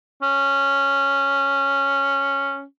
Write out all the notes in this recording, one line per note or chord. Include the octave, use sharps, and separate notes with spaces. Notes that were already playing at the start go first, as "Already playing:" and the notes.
C#4